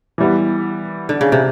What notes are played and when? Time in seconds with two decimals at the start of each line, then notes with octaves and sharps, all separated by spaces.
0.18 E3 G3 B3
1.09 D3
1.21 C#3
1.32 C3